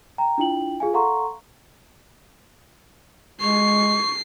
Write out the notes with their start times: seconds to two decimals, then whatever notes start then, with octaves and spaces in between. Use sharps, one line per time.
0.18 G5 A#5
0.38 D4 E4 F4 G5 F#7
0.80 F4 G#4 F5 G#5
0.94 A4 F5 F#5 A#5 C6 C#6
3.41 G#3 C#6 C7